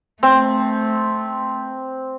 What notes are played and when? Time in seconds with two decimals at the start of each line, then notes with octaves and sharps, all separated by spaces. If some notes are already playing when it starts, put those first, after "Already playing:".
0.23 A3 C4